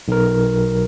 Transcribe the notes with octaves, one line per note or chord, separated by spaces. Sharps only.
B1 A#4